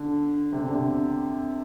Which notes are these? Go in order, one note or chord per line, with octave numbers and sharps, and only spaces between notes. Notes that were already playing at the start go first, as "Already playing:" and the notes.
Already playing: D3
C3
D3
C3